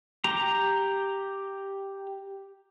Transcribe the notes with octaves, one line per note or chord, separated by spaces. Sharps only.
G4 A#5